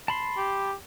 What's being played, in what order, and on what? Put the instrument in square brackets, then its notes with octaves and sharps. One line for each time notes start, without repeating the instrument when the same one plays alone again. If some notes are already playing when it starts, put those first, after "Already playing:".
[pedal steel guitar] A5 B5 C6
[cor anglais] G4